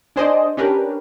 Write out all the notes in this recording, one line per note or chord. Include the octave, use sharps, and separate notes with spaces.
D4 G#4 C5 D5 D#5
C#4 D4 G4 A#4 B4